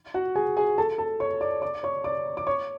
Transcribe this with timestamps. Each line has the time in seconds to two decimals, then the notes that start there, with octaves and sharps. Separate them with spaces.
0.14 F#4 F#5
0.35 G#4 G#5
0.57 G#4 G#5
0.78 A4 A5
0.98 A4 A5
1.20 C#5 C#6
1.41 D5 D6
1.62 D5 D6
1.83 C#5 C#6
2.04 D5 D6
2.37 D6
2.47 C#5 C#6